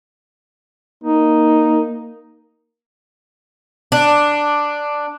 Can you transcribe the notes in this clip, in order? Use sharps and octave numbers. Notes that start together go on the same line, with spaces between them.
A#3 D#4
D4